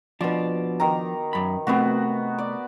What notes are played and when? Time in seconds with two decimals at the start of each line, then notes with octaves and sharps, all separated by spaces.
0.21 B2 F3 D4 D6
0.80 D#3 A#4 A#5
1.33 F#2 B5
1.67 C3 A3 B3 C4 F#4
2.38 D5